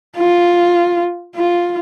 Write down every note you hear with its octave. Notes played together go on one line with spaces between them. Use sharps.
F4
F4